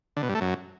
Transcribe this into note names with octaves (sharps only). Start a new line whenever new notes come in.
D3
B2
G2
A3
F#2